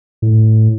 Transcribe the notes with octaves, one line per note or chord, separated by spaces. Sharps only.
A2